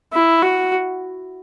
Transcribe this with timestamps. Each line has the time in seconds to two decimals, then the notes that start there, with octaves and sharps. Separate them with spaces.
0.13 E4
0.42 F#4